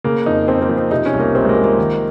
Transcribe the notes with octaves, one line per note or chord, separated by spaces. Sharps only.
C#3 A#3
F2 D#4
F2 C4
A#3
F3
C4
C3 D#4
C#4
C2
A#3
C2 C4
G#3
A#3
F3
A#3
D#3